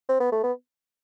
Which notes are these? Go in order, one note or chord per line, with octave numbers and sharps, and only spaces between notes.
C4
B3
A3
B3